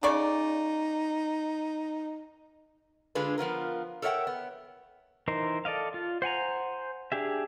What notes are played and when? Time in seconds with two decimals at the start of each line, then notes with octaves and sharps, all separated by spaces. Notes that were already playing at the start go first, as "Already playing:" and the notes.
0.03 C#3 D#4 D5 C#6
3.15 D3 G#3 D4 F4 G#4 B4
3.38 F3 B3 F4 A#4
4.02 A4 A#4 C#5 E5 F#5 G5
4.27 B3
5.28 E3 D#4 A#4 C5
5.65 A4 D5 D#5 F5
5.94 F4
6.22 C5 F#5 G#5 A#5
7.12 D4 G4 G#4 E5